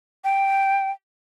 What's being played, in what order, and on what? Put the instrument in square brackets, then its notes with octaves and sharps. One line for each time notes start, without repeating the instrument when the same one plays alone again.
[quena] G5